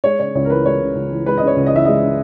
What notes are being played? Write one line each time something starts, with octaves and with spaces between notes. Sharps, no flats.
G#3 C#5
C#3 C#5
C#2 C#5
A#4
E3 B4
G#3 C#5
C#3
C#2
E3
G#3 B4
D#5
C#3
C#5
C#2
D#5
E3 E5
G#3 D#5
C#3